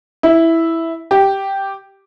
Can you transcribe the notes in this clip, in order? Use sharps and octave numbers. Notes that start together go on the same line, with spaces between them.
E4
G4